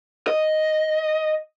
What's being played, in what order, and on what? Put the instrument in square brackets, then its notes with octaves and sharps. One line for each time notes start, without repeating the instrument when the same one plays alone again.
[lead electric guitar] D#5